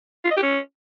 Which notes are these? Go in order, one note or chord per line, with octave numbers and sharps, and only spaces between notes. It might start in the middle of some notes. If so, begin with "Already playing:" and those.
F4
D#5
G4
C#4